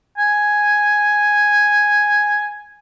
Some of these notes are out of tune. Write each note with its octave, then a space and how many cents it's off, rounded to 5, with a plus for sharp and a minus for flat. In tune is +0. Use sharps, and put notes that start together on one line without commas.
G#5 +0